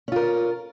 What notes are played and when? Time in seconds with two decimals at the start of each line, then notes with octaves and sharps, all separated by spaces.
0.08 C#4
0.12 F4
0.16 A#4